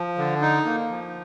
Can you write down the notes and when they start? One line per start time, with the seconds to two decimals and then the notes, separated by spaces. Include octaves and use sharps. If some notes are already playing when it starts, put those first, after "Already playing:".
Already playing: F3
0.18 D3
0.42 D#4
0.65 A#3
0.90 F3